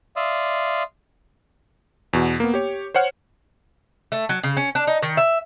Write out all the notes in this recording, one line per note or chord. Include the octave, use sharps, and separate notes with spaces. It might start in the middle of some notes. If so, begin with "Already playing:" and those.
D5 E5 F5 C6 D#6 E6
E2 B2 F#4
A#3 B3
G4 C#5
C5 C#5 F#5 F6
A3
F#3
C#3
C#4
D4
D#4
D#3
E5